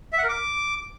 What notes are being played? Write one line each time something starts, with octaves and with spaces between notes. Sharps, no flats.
E5
F#5
A#4
D6